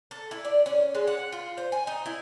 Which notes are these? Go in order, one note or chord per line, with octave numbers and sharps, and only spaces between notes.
A4
E4
D5
C#4
G#3
F#5
F4
C5
G#5
D#4
E4